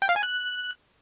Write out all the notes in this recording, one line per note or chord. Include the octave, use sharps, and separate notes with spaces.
G5
F5
G#5
F#6